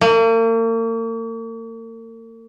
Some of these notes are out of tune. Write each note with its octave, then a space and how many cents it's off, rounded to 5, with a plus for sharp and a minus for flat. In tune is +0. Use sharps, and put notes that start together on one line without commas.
A#3 -40